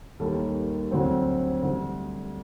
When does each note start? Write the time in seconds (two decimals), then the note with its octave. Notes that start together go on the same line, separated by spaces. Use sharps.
0.20 D#2 D#3 G3 A#3 A4
0.91 D2 D3 F#3 C4
1.63 D2 D3 G3